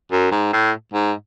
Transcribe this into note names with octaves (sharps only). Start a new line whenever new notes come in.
F#2
G#2
A2
G#2